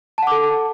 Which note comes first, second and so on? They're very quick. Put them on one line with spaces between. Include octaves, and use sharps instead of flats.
A5 F#5 D6 A4